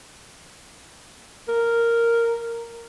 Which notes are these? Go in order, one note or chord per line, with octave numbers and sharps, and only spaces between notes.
A#4